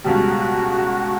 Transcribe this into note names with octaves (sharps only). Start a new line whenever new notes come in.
C#2 B2 G3 F#4